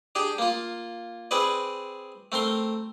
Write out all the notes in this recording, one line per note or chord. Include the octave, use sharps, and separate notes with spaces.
D4 G4 G#4
A#3 F4
C4 G#4 B4 D5
A3 C4 A#4 C6